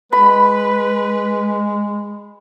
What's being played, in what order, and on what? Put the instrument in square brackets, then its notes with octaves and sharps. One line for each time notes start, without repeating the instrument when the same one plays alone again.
[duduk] G#3 [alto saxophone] B4 [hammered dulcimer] B5